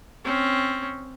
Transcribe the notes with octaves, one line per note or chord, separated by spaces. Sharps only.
C4 C#4